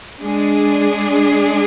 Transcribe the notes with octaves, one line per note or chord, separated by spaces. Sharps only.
G#3 D4 G#4